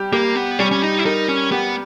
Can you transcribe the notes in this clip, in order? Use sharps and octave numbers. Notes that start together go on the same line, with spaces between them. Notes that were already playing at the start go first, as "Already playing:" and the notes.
Already playing: G3 G4
A#3 G4
B3
G3 C#4
C#4
D#4
E4
D#4 A#4
C#4
B3 G4